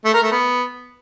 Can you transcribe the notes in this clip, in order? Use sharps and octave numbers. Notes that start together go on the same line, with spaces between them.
A3
A#4
A3
B3